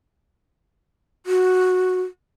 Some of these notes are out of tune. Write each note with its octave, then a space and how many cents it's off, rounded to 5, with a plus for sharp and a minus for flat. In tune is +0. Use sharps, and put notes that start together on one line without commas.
F#4 -5